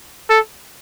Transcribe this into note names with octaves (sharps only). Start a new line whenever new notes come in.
A4